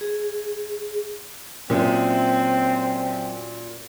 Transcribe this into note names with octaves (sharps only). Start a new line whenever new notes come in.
G#4
F#2 A#2 C4